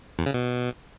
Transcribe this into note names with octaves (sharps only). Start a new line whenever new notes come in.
E2
C#3
B2